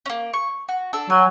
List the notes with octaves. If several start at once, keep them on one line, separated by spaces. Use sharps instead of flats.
A#3 C#4
C#6
F#4
D4 A4 E6
F#3 G#5